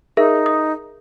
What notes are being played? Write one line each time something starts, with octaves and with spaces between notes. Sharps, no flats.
D#4 G#4 A#4 E5
D#6